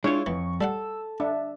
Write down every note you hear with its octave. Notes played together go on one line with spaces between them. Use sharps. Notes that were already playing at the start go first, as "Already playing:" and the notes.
G#3 D4 E4 F4 C#5
F2 E3 C#6
G3 A4 F5 F#5 E6
D4 E5